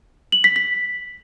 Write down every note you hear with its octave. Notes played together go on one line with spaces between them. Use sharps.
F#7
B6
B6